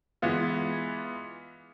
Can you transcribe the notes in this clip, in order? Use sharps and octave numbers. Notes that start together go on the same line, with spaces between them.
E3 G#3 B3 F4